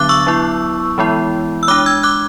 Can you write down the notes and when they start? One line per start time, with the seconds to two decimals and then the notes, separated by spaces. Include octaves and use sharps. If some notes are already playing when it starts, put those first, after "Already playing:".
Already playing: D3 F#3 B3 D4 D6 F#6 A6
0.09 C#6 E6
0.27 F#3 B3 E4
0.98 E3 G#3 B3 E4
1.63 E6
1.68 G#3 D4 D6 F#6
1.86 E6 G#6
2.03 D6 F#6